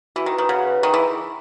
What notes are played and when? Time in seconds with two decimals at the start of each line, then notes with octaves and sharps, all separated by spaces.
0.16 E3 F#4
0.26 D#3
0.33 B4
0.38 D#3
0.49 C#3 F#5
0.66 B4
0.82 D#3 G#4
0.94 E3